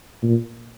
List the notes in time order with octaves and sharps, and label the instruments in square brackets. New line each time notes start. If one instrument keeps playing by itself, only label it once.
[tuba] A#2